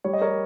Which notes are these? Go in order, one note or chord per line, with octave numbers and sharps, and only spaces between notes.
G3 C#5
D#5
A#4 C#5